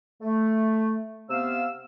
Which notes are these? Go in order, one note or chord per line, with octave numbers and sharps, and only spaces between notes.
A3
C3 B3 F5 E6